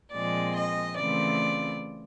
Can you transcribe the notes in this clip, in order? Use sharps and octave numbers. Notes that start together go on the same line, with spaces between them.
A#2 F3 G#3 C4 D5
D#5
C#3 E3 A3 C4 F4 D5